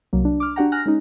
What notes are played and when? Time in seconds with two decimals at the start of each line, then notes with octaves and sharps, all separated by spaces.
0.13 C2 F#3 A#3
0.25 D4
0.40 D6 F6
0.56 D4 F#4 G4 F#5 G5 A#5
0.72 G#5 F6 F#6 A#6
0.86 G#3 C#4 D#4